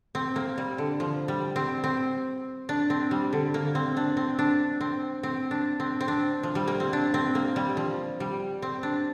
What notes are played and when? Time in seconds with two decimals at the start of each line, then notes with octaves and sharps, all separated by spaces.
0.15 C4
0.36 A#3
0.58 G3
0.78 D3
1.00 F3
1.28 G3
1.56 C4
1.84 C4
2.69 D4
2.90 C4
3.11 G3
3.33 D3
3.54 A#3
3.75 C4
3.97 D4
4.17 C4
4.39 D4
4.81 C4
5.23 C4
5.51 D4
5.80 C4
6.00 C4
6.08 D4
6.43 F3
6.55 G3
6.68 A#3
6.80 C4
6.93 D4
7.14 C4
7.35 A#3
7.56 G3
7.77 F3
8.20 G3
8.62 C4
8.83 D4